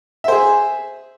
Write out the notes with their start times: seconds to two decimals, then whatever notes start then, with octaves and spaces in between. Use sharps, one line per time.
0.24 E5
0.28 C5
0.32 G#4